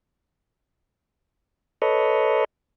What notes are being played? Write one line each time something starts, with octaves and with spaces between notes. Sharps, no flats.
A4 B4 C#5 D#5